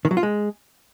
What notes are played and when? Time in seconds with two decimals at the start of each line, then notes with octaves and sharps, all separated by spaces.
0.05 D#3
0.11 F#3
0.17 F4
0.23 G#3